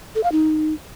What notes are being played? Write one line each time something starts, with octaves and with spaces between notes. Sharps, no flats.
A4
F5
D#4